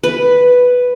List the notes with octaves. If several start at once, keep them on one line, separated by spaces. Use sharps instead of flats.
B4